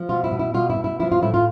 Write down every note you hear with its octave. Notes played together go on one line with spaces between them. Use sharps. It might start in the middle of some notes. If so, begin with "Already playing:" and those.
Already playing: F3
B2 F4
E4
B2
E4
B2 F4
E4
B2
E4
F3 E4
F4
A2 E4
F4